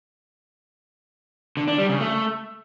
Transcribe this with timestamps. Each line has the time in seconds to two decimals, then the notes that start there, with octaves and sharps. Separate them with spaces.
1.57 D3
1.68 D4
1.78 G3
1.89 C#3
2.00 A3